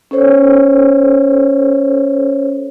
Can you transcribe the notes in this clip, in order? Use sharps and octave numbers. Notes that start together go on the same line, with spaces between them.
C#4 A4 C5 C#5